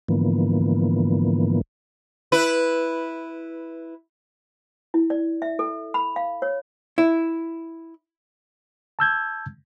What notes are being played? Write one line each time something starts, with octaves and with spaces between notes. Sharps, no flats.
G#2 D3 E3 F3 A#3 B3
E4 B4
E4
D5
E5
A4
B5
F5
C#5
E4
A5 E6 G6 G#6